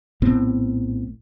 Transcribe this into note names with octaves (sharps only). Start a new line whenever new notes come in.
A#1 A2 B3 C4